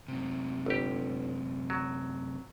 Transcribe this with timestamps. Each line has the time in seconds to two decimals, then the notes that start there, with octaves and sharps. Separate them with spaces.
0.08 F#2 C3
0.66 G1 G4
1.70 F#3